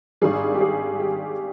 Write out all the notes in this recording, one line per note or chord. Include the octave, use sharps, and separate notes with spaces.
G#1 G2 D#3 G3 G#4
G4
G#4
G4